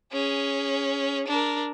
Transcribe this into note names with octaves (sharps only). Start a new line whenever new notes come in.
C#4 G#4
D4 A#4